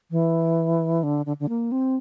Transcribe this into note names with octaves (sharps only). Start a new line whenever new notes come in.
E3
D3
D3
D3
A#3
C4